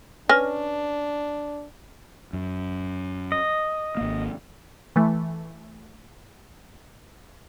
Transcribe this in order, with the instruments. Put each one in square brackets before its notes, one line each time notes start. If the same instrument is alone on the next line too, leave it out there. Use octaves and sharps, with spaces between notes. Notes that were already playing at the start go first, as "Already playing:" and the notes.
[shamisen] C#4 [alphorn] D4 [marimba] B4 F6 A#6
[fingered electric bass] F#2
[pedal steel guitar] D#5
[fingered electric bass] G#1 A#3
[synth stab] E3 A3